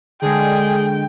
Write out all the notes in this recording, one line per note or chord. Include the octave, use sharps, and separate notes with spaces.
D3 G#3 G#4 G5